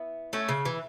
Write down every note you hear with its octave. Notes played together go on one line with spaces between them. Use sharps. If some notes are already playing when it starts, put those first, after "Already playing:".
Already playing: B3 E4
A3 C#4
C#3
E3